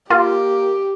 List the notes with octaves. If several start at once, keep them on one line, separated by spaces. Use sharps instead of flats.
A#3 F4 G4